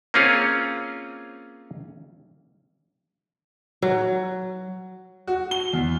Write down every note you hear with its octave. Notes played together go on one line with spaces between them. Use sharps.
A#3 C4 C#4 F4 G#4 C#5
F#3
F#4
G7
E2